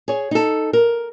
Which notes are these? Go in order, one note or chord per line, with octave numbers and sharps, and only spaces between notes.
G#4 C#5
D#4 A4
A#4